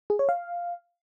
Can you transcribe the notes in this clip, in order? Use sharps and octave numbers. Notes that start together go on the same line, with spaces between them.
G#4
C#5
F5